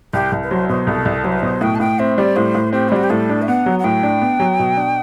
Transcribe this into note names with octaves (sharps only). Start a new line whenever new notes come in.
C2 G4
C2
B4
F#3 C5
B2 C5
C2 A4
C2
F#3 C5
B4
B2 C5
A2 G5
A5
A2 G5
C4 E5
G3 D5
A2 C5
A2
C4 G4
E4
G3 F#4
G4
A2 A4
D4
E5
B3 F#5
F#3
F#5
A2 G5
D4
B3
F#3
B2
D4